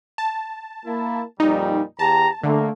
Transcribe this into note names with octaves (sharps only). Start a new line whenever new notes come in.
A5
A#3 E4
F2 A#2 G3 D#4
E2 G4 A5 A#5
D3 A3 A#3